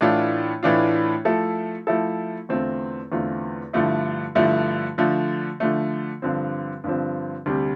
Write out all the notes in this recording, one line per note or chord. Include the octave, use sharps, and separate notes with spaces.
A2 E3 A3 D4 F4
A2 E3 A3 D4 F4
F3 A3 E4 A4
F3 A3 E4 A4
E2 D3 A3 C4 F4
E2 D3 A3 C4 F4
G2 D3 F3 A3 E4
G2 D3 F3 A3 E4
D3 F3 A3
D3 F3 A3
G2 D3 F3 C4
G2 D3 F3 C4
D2 C3 G3